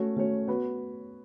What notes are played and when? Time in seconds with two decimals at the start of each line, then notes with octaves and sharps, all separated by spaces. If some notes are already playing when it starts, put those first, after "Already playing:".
Already playing: A3 C#4 F#4 C#5
0.17 A3 C#4 F#4 C#5
0.47 B3 F#4 B4